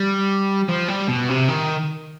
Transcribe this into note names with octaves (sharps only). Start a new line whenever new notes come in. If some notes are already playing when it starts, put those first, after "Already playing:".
Already playing: G3
F3
G3
B2
C3
D#3